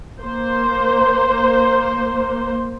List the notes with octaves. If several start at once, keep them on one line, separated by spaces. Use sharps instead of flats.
A#3 C5